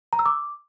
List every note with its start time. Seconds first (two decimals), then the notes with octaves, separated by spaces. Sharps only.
0.13 A#5
0.19 E6
0.26 D6